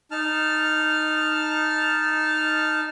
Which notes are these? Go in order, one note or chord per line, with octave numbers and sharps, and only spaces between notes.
D#4 A5 F6